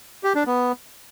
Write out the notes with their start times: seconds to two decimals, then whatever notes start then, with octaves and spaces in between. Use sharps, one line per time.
0.24 G4
0.35 D4
0.47 B3